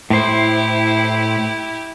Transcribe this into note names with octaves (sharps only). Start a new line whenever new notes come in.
A2 E4 G4 C5